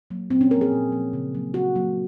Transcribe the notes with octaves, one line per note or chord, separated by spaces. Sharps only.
F#3 A#3
A#2 C4
C#4
F3 A#3 A#4
G#4
A#2
F3 A#3
C#3
F#3 A#3
C#3 F#4
F#3 A#3